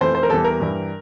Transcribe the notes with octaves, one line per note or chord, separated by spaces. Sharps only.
F2 E3 A3 C5
C5
A#4
E2 E3 G3 A4
A#4
G2 E3 G3